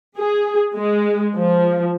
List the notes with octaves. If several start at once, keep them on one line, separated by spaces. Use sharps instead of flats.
G#4
G#3
F3